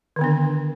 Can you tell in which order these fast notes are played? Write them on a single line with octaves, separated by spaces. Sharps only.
D#3 D3 B3 D4